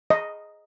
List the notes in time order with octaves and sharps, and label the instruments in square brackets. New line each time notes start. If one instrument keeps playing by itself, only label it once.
[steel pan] D#5